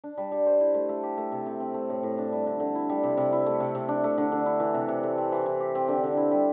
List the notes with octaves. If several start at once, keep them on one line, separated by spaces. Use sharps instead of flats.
D4
G3
G3
C5
E4
A3
A3
G4
A3
C3
C3
C4
A3
A2
A2
D4
G3
D3
D3
E4
G3
C3
C3
E4
A3
C3
C3
D4
A3
D3
D3
E4
E3
C3
C3
A3
C4
E3
E3
G4
C4
D3
D3
E4
G3